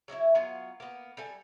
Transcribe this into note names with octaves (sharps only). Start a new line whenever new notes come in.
F#3 E4 D#5 E5
F#3 B3 F4
A#3 B3
G3 A4 G#5